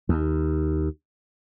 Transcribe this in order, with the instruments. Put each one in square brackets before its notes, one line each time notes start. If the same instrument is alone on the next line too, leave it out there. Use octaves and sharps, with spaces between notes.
[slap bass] D#2